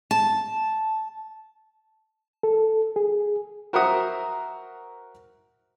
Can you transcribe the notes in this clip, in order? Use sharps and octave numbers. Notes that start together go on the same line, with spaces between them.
A5
A4
G#4
F#4 A#4 C5 E5 F#5 D#6